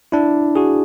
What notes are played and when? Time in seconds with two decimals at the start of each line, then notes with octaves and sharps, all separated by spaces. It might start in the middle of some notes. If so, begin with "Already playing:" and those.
0.12 D4 E4
0.56 F#4 G#4